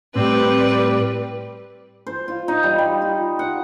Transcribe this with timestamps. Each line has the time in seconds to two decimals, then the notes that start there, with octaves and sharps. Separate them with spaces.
0.15 A2 G3 C4 B4 D5
2.07 C5
2.28 F4
2.48 D#4
2.63 G3
2.78 G3
3.02 F4
3.39 F#5